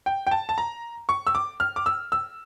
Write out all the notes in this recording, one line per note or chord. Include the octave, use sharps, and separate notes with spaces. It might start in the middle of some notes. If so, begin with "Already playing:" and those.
G5
G5
A5
A5
A#5
C#6
E6
D6
F6
D6
E6
E6